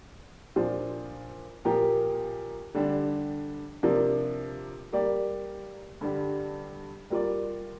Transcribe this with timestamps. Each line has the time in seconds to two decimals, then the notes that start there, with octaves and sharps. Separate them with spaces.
0.56 A#2 F3 D4 F4 C5
1.65 A#2 F3 A#3 G4 A#4
2.75 D3 G3 D4
3.83 C3 F3 A#3 D4
4.93 G3 A#3 G4 D5
6.01 G2 D3 G3 D4 G4
7.10 G3 A#3 F4 D5